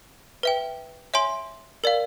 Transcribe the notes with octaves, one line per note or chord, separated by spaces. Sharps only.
B4 E5 G5
C#5 E5 G#5 C6
A#4 D5 F5